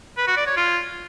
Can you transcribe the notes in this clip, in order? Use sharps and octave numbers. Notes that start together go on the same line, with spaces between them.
B4
F#4
D5
C#5
F4